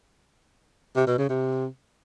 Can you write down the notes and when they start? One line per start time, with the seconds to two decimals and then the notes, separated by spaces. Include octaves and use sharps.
0.96 C3
1.07 B2
1.18 C#3
1.29 C3